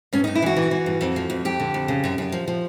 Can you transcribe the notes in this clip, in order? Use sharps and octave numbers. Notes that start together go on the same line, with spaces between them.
G2 C#4
G2 D#4
E4
E3 F#4
E3
E3
G2
F2
F3
F2
F2 G4
D3
F2
C#3
F#2
F#2
F3
F3